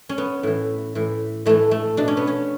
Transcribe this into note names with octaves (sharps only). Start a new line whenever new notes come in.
C#4
B3
A2 E3
A2 E3
A2 E3 A3
A3
B2 D4
C#4
B3
C#4